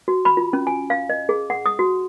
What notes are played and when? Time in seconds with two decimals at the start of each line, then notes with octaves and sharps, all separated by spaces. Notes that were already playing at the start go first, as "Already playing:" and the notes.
0.08 F#4
0.25 B5
0.37 F4
0.53 C#4
0.67 G#5
0.90 F5
1.10 D#5
1.29 G#4
1.50 F#5
1.66 D#6
1.79 F#4